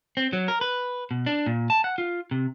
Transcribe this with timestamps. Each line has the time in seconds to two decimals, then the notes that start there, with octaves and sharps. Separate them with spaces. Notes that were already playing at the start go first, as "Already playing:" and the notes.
0.17 C4
0.33 F#3
0.48 A#4
0.61 B4
1.11 B2
1.26 D4
1.47 A#2
1.70 A5
1.84 F#5
1.98 F4
2.31 C3